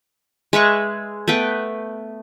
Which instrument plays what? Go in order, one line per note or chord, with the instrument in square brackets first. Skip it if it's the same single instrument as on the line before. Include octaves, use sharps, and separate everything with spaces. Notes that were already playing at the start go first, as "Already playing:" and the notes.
[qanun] G#3 B4 E5 C#6
A3 B3 B4 G5